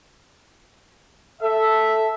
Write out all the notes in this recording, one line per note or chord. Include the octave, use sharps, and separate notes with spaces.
A4 E5